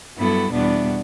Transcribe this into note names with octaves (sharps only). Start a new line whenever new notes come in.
G2 F#3 B3 E4 A4
E2 B2 G3 B3 D4